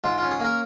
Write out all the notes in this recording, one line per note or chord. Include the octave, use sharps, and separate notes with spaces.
G#2 F4
C#4 F4
G#4
A#3 A#4